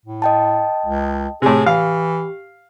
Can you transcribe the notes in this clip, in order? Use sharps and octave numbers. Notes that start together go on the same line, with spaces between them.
A2
D#5 G5 A5
C#2
A2 C3 G#4
E3 G4 F5